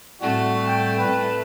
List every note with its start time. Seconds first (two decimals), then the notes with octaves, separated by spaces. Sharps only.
0.22 A2 G3 A3 C4 F#4 A4
0.66 G5
0.98 B4